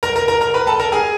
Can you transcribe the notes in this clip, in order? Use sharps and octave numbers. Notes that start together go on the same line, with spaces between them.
A#4 A#5
A#4 A#5
A#4 A#5
A#4 A#5
B4 B5
A4 A5
A#4 A#5
G#4 G#5